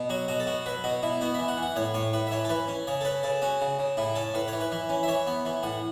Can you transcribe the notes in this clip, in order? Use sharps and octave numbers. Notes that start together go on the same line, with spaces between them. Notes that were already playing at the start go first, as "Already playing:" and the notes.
Already playing: B2
F#3 F#4
B2 F#4
A4
B2 F#4
F#3 B4
B2 F#4
B2 E4
B3 F#4
E3 E5
F#5
E3
F#5
A2 C#5
A2 C#5
A2 B4
E5
E3 C#5
A4
E3 B4
C#4
C#3 C#5
A4
C#4 B4
C#3 A4
C#4 F#4
C#3
C#3
A2 E4
C#4 A4
A2 B4
E3 C#5
B4
E3
C#4
E5
E3 C#5
B3
E3
A2 F#5